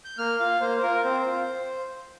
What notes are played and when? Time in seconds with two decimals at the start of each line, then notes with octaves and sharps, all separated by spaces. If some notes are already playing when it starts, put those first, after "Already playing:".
0.05 G6
0.18 A#3 F6
0.40 F4 F5
0.61 A#3 C5
0.78 C5
0.82 F4 A#4
1.04 C4 C5
1.26 F4